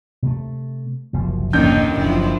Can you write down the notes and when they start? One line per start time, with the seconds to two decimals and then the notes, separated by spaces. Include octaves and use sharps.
0.22 C3 A3
1.13 F#1 C2 F3
1.53 A1 D#2 A#3 D4 D#4 G6
1.97 F#1 F3 D4 E4